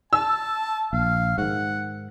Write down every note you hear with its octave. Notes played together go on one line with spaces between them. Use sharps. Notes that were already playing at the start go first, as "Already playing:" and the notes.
A5 E6
A#1 F5
G#2 D#3 F#5